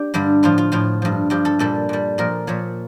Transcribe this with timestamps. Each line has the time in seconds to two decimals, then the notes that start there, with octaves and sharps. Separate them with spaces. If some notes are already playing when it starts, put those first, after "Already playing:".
Already playing: D4 G4
0.14 G2 D3 G3
0.43 A2 F3 F4
0.58 F4
0.72 A2 F3 F4
1.02 G2 F3
1.30 G2 F3 G4
1.45 A4
1.59 A#2 G3 A4
1.89 A#2 G3
2.18 A#2 F3 A#4
2.47 A#2 F3 C#5